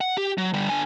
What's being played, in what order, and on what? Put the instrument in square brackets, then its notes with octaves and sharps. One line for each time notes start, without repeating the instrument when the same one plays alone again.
[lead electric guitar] F#5
G4
F#3
D3 G3
D3 G#5